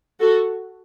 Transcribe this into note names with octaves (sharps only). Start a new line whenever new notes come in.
F#4 A4